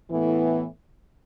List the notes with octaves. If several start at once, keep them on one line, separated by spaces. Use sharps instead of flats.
A2 E3 B3